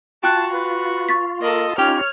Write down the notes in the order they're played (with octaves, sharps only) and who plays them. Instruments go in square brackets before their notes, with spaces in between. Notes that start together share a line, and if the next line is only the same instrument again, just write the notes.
[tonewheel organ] F4 [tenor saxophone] F#4 [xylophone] G5 F#6 [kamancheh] A5
[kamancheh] B4
[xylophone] C#6 A6 B6
[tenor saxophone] A#3 [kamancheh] A4 D#5
[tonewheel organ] C#4 D#4 F4 [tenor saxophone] G4 [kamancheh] C#5 F6